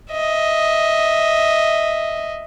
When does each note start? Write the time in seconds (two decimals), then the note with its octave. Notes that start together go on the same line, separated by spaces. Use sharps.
0.12 D#5 E5